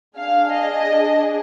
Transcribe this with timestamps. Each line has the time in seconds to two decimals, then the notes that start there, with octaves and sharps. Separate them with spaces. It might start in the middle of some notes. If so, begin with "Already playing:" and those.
0.17 D4 G#4 F5
0.53 D#5